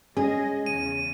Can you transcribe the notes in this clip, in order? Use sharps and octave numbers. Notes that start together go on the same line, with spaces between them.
G#3 C#4 G#4 D#5
E2 C#3 D#7